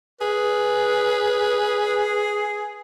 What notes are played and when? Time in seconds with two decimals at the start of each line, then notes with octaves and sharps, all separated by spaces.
0.21 G#4 B4